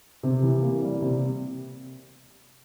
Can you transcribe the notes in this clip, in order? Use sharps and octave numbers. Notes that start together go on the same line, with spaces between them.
C3
E3
A#3
G3
C3